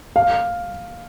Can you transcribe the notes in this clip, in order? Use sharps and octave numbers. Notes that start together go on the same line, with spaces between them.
F5